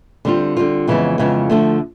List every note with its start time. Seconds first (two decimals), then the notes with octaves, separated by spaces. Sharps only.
0.25 D3 G3 C4 F4
0.57 D3 G3 C4 F4
0.87 F2 C#3 E3 G#3 B3
1.18 F2 C#3 E3 G#3 B3
1.50 D3 F3 A3